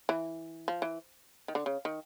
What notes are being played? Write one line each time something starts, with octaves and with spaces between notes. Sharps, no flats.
E3
F3
E3
D#3
D3
C#3
D#3